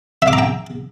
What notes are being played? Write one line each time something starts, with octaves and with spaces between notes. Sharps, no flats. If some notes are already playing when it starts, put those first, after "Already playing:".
E5
D6
A#5
G5